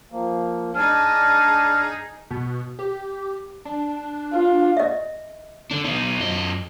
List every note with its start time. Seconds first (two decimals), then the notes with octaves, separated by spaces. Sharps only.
0.12 F3 A#3
0.75 D4 D#4 G#4 A5 F6
2.31 B2
2.79 G4
3.65 D4
4.33 F4
4.77 D#5 E5
5.71 D3 D4
5.85 B2 D#4
6.19 F#2 D#5